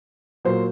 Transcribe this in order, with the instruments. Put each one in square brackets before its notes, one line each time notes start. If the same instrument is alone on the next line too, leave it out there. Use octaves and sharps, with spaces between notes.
[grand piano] A#2 F#3 C5